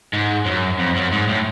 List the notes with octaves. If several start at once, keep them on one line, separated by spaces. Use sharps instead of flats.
G#2
F#2
F2
F#2
G#2
A2